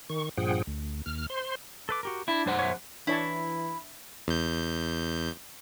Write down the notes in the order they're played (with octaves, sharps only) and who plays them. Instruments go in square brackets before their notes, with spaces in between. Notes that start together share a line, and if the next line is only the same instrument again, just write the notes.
[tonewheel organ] D#3 C#6
G2 A#2 F3 G#4 F#5 G5
D2
D#2 F6
C5 C6
[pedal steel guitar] A4 B4 D6
F#4 G4 A#4
[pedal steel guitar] D4 [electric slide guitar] E4
[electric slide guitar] F#2 C5 F#5
[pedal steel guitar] C#5 E5
[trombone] E3 [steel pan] D4 C#5 A5 [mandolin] E4
[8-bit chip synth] E2 G6